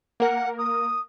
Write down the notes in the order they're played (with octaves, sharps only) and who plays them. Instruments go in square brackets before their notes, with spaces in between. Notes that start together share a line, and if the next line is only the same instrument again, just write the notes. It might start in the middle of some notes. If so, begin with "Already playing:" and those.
[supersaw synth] A#3 A#4 [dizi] F#5
[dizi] D#6